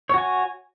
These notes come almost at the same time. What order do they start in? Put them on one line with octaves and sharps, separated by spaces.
C#5 F#4 G#5